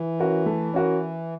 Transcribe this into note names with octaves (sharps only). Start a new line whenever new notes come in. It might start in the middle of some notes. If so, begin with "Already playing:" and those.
Already playing: E3
C#4 F#4 A#4
A3
C#4 F#4 A#4